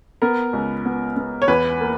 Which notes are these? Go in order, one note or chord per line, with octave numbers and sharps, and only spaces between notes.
B3 A#4
C#2
B3
B3
C#5
E2 B4
A#3